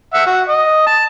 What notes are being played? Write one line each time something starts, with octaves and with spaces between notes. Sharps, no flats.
E5 F#5
F#4
D#5
A5